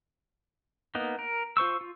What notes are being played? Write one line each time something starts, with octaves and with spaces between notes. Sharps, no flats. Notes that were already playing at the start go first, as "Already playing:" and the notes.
A#3 B3 D#4
A#4
F4 C5 C#6 E6
F4